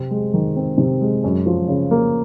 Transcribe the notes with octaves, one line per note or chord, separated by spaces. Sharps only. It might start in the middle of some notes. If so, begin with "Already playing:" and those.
Already playing: C3 C4
G#3
D#3
C4
C3
G#3
F#2
F3
C#3
A#3